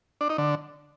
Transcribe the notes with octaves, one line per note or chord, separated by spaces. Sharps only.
D4
D#4
D3